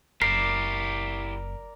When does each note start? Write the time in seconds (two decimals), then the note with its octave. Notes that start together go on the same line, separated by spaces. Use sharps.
0.22 F#1 E4 G4 A#4 D5 C7